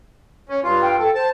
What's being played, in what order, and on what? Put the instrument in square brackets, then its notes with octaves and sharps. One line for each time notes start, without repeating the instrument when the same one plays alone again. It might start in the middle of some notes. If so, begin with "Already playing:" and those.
[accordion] C#4
G2 F4
[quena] G5
[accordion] A4
[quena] C5 [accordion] A5